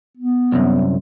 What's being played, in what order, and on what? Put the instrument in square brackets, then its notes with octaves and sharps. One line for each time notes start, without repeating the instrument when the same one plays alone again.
[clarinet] B3
[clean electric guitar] C2 F#2